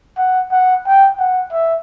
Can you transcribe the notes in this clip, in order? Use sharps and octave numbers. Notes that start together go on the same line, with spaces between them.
F#5
F#5
G5
F#5
E5